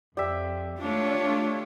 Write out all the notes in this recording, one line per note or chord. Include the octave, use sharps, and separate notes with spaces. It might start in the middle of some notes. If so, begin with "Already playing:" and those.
F2 G4 D5 E5 B6
A3 D4 F4 C#5